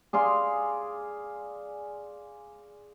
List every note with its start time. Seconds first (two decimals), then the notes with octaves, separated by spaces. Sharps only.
0.13 G#4 D5 F5 C6